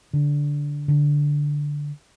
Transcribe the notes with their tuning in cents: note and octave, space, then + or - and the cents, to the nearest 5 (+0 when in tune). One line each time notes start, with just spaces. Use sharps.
D3 -10
D3 -5